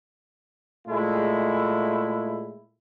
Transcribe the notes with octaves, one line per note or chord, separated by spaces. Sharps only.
A#2 G#3 A3 E4